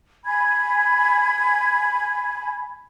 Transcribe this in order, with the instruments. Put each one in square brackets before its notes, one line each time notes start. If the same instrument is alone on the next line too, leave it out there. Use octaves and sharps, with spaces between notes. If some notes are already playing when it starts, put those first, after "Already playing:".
[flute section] G#5 B5 G#6